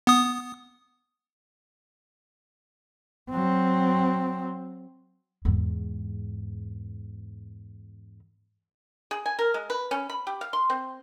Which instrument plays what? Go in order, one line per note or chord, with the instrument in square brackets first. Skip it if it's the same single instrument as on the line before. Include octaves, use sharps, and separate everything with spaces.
[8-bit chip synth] B3 D#6
[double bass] F#3 C4
[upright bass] E2 G#2
[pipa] G#4
G#5
A#4
G#3
B4
C#4
B5
G4
F5
C6
C4